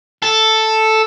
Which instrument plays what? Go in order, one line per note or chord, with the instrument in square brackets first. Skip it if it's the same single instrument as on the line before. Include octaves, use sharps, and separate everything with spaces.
[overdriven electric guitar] A4